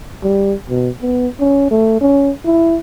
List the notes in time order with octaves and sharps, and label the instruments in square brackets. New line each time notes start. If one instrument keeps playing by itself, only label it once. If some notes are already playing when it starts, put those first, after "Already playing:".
[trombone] G3
B2
B3
C#4
A3
C#4
E4